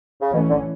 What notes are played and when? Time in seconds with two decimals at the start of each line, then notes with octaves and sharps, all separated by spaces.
0.21 C#3
0.33 B2 E3 A3 C#4
0.50 D3